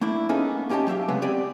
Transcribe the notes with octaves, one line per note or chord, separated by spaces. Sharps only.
A3 A#3 D4 E4
A#3 B3 C#4 D#4 G#4 A4
A#3 C#4 G4 D#5 G5 A5
F#3 G4 E5 F5
C#3 G#3 A3 B3 C4
B3 C4 G4 D5 G5 G#5